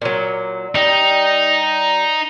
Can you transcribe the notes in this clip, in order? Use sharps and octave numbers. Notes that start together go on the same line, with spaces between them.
A#2 F#3
G3 D#4